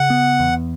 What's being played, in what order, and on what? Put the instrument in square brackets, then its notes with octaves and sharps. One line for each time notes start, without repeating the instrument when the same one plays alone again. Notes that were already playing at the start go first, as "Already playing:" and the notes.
Already playing: [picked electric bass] C#3 [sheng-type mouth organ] F#5
[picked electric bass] B3
E2